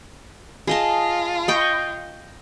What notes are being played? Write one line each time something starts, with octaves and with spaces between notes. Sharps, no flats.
F4 G#4 D#5 A5
D#5 G5 C#6